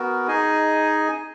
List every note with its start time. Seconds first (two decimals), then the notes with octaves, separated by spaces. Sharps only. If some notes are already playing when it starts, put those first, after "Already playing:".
Already playing: B3 F#4 A#4
0.28 D#4 G#4 D#5 G#5